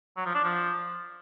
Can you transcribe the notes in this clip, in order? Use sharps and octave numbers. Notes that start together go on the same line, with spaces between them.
F#3
F3
D4
F3